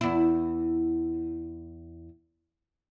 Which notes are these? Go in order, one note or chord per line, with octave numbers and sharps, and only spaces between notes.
E2 E4